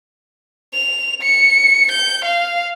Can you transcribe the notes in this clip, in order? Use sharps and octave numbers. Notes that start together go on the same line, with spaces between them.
F7
C#7
G6
F5